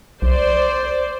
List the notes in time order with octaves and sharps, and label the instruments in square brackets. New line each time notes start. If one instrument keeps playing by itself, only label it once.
[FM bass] B1 [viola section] C5 D5